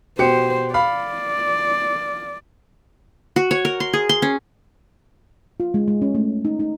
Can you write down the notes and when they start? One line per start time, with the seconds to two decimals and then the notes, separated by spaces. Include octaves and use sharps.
0.19 B2 G4 C5 C#7
0.74 D5 F5 B5
3.36 F#4
3.51 C#5
3.65 A#4
3.80 C6
3.93 G#4
4.09 C6
4.22 C#4
5.60 F4
5.74 G#3
5.88 G#3
6.02 C#4
6.15 A3
6.45 D#4
6.60 D#4